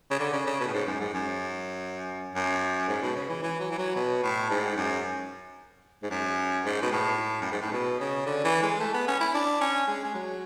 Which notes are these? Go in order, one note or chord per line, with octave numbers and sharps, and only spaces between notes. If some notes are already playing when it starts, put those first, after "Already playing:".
C#3
D3
C#3
C#3
B2
A2
G#2
F#2
G#2
F#2
F#2
G#2
B2
C#3
E3
E3
F#3
E3
F#3
B2
A2
G#2
F#2
G#2
F#2
G#2
B2
A2
F#2
G#2
A2
B2
C#3
D3
E3
G#3
A3
B3
C#4
E4
D4
C#4
G#3
G#3
F#3